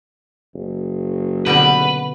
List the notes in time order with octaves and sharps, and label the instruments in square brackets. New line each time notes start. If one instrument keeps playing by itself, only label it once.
[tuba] F#1
[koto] B2 D3 G3 [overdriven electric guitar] B4